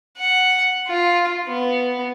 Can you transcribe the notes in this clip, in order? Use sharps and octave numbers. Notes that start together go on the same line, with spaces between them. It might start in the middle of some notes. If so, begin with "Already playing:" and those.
F#5
F4
B3